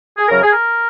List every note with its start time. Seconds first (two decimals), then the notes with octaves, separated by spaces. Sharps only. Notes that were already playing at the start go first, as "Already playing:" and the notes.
0.17 G#4
0.29 F#2 C#3 F#3 A#4
0.42 G#4
0.51 A#4